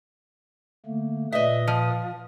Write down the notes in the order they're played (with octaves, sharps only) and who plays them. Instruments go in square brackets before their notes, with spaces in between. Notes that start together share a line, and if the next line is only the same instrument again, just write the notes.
[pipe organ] D3 A3 A#3
[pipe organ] A#2 B4 D#6 [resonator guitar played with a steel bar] D#5 E5
[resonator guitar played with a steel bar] F3